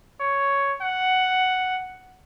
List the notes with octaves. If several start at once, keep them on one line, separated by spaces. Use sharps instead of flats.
C#5
F#5